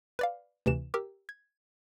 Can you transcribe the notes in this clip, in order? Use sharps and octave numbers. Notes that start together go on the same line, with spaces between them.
B4 D5 F5
D2 C3 E3 E7
G4 A#4 E6
G#6